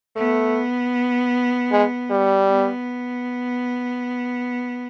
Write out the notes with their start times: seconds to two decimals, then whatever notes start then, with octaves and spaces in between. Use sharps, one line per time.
0.16 A3 B3
1.72 G#3
2.11 G3
2.49 B3